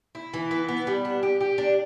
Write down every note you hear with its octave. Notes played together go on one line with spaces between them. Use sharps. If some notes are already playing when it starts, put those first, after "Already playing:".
E4
E3
B3
B3
G3
D4
G4
G4
D4